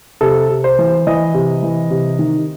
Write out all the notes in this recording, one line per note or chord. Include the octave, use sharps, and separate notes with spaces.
C3 A4
C3
C5
E3
E3 D#5
C3
E3
C3
D#3